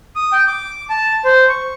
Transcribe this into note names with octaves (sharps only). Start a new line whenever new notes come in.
D#6
G5
D6
A5
C5
C#6